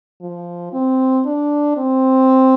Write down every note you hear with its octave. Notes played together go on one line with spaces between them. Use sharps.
F3
C4
D4
C4